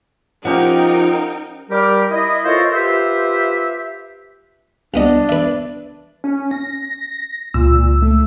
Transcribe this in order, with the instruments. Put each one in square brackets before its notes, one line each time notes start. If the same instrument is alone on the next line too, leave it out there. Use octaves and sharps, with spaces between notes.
[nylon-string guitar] F3 G4 [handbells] C#4 F#5 [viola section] D#4 A#4 G5
[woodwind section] G3 G4 A#4
E4 D#5
F4 A4 A#4 C5 C#5 D#5
F4 G4 B4 C5 E5
[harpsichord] C2 B3 D#5 [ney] D4
[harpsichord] B4 E5
[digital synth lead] C#4
A#6
[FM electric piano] C#2 E6 [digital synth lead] A#2
[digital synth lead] A3